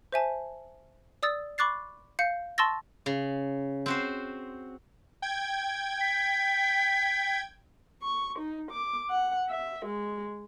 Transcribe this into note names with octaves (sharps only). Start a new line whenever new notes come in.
C5 E5 G#5 A5
D5 D#6 E6 A6
B5 C#6 D6 F#6 A6 C7
F5 G6 C#7
A5 C6 C#6 E6 A6 A#6
C#3
C4 F#4 C5
G5 G#6
B6
C#6
D#4
D6
F#5
E5
G#3